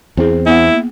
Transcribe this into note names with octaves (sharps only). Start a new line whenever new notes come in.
E2 C4 E4 G#4
B3 E4 F#5
A#3